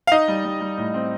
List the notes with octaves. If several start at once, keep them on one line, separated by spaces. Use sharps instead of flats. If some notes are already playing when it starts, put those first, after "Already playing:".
F5
D#4 D#5
G3
G3
G3
A2
C4